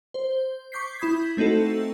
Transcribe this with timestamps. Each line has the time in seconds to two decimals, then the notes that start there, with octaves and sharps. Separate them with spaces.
0.14 C5
0.72 C#6 D6 G6 B6 C7
0.98 E4 B5 D#6 G6 G#6 B6
1.37 A3 C4 D#4 F#4 A4